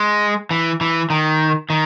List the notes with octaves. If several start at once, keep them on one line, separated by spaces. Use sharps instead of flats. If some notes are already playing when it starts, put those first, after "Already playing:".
Already playing: G#3
E3
E3
D#3
D#3